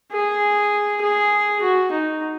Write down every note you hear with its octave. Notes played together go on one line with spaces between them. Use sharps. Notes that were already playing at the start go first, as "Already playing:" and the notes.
G#4
G#4
F#4
D#4